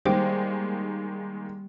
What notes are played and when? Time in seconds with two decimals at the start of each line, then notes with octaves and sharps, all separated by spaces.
0.05 D#3 G3 G#3 A#3 C5 G5 D6